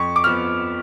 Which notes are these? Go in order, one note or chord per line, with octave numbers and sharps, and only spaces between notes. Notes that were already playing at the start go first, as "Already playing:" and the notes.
Already playing: F2 C#6
D6
F3 B3 F6